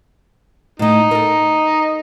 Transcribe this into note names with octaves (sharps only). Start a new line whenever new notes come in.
A2 A3 D#4
A4 A#4